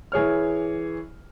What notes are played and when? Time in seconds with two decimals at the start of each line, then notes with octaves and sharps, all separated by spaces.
0.12 E3 G#4 C#5 F6